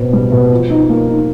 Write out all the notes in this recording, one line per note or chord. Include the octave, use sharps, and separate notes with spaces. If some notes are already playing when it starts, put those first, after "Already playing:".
Already playing: B2 C4
G3
B2
F3
D#4
A#3
D#4